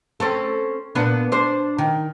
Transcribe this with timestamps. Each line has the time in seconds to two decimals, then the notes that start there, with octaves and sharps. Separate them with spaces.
0.20 C4 C#4 A4
0.95 A#2 B3 D4
1.32 D4 C5
1.78 D#3